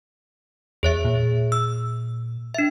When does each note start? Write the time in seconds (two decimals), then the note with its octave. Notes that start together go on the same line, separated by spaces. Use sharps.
0.83 E2 G#4 C#5 E5
1.05 A#2
1.52 E6
2.54 D4 E5